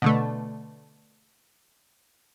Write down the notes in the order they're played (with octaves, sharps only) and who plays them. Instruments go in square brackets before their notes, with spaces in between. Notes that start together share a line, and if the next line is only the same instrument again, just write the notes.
[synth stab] B2 D3 A3